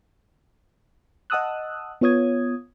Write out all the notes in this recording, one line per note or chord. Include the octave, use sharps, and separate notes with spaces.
D#5 F#5 A5 D#6 E6 F#6
B3 F4 C#5 D#6 G#6